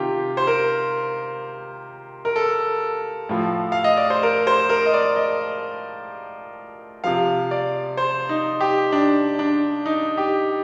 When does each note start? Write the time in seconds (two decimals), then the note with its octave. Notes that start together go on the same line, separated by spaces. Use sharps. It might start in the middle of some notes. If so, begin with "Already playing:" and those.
Already playing: C3 D#3 F4 G4
0.37 C5
0.47 A#4
2.25 A#4
2.36 A4
3.29 A2 F3
3.72 F5
3.84 D#5
3.97 D5
4.10 C5
4.23 A#4
4.47 C5
4.70 A#4
4.86 D#5
4.94 D5
5.16 D#5
7.04 C3 F3 F5
7.51 D5
7.97 C5
8.29 D#4
8.61 G4
8.92 D4
9.39 D4
9.86 D#4
10.18 G4